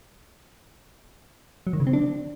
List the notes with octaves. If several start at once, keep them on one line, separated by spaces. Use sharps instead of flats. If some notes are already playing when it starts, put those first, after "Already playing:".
F#3
D#3
C#3
C4
D4